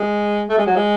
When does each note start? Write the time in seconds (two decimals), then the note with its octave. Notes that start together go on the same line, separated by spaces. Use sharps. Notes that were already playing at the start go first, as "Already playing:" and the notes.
Already playing: G#3
0.50 A3
0.58 G#3
0.67 F#3
0.76 G#3